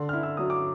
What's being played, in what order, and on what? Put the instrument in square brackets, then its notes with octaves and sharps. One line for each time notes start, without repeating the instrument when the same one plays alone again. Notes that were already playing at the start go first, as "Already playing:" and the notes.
Already playing: [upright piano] D3 [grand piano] C6
[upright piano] E4 [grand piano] F6
[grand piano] E6
[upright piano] F#3 [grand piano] D#6
[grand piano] D6